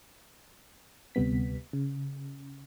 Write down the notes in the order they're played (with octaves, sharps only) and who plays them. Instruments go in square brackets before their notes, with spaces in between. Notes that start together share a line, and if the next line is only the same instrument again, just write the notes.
[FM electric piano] D2 C3 G3 B3 B6
C#3